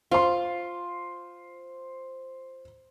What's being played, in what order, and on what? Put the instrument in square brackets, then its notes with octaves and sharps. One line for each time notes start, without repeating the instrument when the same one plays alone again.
[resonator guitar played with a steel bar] F4 [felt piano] C5 C6